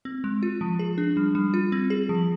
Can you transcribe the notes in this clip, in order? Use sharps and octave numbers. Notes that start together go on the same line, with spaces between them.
C4
G#3
F4
F3
G#4
D4
G3
G3
F4
C4
G#4
F3